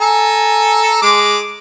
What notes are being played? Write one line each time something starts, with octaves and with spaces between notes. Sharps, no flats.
A4 G#5 A#5
G#3 D6